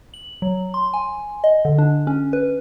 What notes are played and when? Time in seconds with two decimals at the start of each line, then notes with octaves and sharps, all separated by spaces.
0.14 F#7
0.42 F#3
0.74 C6
0.94 G#5
1.44 D#5
1.65 D3
1.78 D4
2.07 C#4
2.33 B4